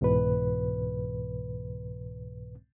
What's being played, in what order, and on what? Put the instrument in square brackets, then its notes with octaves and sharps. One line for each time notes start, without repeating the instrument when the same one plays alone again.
[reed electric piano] C2 G#2 B2 E3 B4